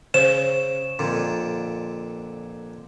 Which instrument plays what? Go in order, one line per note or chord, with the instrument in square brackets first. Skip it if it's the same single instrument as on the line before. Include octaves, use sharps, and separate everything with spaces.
[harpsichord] C#3 [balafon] C5 [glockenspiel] E7
[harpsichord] F2 A#2 D3